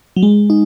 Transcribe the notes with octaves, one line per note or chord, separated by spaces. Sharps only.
F#3
G#3
D#4